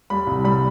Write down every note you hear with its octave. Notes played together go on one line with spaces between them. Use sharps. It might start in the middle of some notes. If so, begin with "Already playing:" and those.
G3 B5
C2
G3 B5